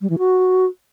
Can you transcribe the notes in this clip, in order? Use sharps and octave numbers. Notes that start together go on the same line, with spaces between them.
G3
E3
F#4